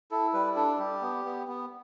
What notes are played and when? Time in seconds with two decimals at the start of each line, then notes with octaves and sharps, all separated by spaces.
0.11 E4 A4
0.33 G3 B4
0.56 D4 A4
0.79 G3 G4
1.02 B3
1.25 B3
1.48 B3